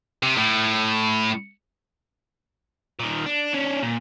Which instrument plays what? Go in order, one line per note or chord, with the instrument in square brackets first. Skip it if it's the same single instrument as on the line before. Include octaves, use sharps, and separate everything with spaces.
[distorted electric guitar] C3
A2
[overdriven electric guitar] A#2 D#3
D4
C#4 D4
A#2